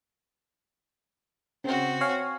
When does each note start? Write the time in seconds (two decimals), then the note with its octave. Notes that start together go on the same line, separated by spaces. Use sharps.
1.64 C#3 C4 F#4
2.01 C#5 F5 G#5